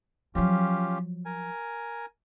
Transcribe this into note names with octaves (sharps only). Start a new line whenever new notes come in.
F3 F#3 C#4 F4 G4
A#4 G#5